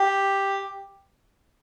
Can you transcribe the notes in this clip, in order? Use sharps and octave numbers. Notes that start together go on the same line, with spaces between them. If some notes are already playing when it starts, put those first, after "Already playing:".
Already playing: G4